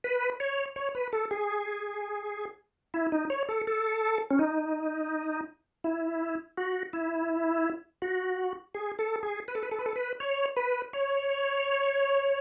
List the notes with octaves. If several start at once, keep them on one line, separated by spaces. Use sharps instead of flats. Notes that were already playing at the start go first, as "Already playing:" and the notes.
B4
C#5
C#5
B4
A4
G#4
E4
D#4
C#5
A4
A4
C#4
D#4
E4
F#4
E4
F#4
G#4
A4
G#4
B4
A4
B4
A4
B4
A4
B4
C#5
B4
C#5